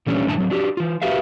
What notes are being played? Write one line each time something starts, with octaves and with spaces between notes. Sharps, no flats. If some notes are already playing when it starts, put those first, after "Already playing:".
A#2 E3 G3 A3 C#4 D4
F#2 A2 D3 A3 G4 A5
F#3 C4
D4 F#4 G4
E3 F4
F#4 G4 A#4 B4 E5 F5